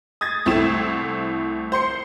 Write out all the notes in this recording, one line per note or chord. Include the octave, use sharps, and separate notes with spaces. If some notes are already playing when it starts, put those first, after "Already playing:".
D#6 G#6 A6
C2 A3 C4 E4 E7
C5 C6 C#7